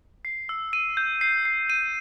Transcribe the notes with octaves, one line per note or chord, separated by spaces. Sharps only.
C7
E6
D#7
G6
C7
C7
D#7